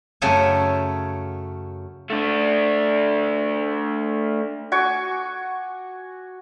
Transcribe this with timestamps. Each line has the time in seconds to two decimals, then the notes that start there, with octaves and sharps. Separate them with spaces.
0.22 F#2 C#3 A3 A4 C#5 G#5
2.10 A3 D4
4.72 F#4 G#5 C#6 D6